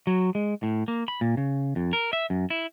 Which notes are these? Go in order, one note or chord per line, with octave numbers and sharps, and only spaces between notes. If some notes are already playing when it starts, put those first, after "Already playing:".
F#3
G#3
A2
A#3
B5
A#2
C#3
F2
A#4
E5
F#2
E4